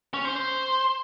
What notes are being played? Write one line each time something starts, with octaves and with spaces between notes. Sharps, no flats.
C#4
C5
C5